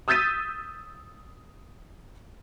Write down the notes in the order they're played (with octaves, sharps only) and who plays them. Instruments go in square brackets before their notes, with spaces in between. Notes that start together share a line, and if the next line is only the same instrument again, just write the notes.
[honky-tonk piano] D#6 E6 G6 A6 B6 D#7